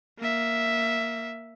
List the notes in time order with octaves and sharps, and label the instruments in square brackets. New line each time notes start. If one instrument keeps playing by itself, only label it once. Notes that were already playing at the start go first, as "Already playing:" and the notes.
[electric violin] A#3 E5